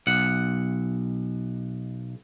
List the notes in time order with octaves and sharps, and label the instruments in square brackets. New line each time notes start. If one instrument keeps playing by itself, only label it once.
[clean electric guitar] B1 F#5